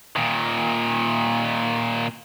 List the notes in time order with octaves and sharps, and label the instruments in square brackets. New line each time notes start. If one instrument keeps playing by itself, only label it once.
[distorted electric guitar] A#2 D#3